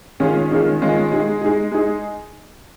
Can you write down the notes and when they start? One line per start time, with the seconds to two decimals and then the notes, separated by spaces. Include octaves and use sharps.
0.20 D#3 G#3 C#4 F4 G#4
0.51 D#3 G#3 C#4 F4 G#4
0.81 D#3 G#3 C#4 F4 G#4
1.12 G#3 D#4 G#4
1.41 G#3 D#4 G#4
1.72 G#3 D#4 G#4